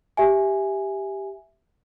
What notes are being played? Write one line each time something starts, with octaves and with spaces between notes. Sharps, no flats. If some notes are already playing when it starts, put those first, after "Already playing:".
G4 E5 G#5